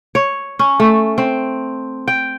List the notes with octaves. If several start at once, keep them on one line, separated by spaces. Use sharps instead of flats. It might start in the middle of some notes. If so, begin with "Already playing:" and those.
C#5
C#4
A3
C4
G5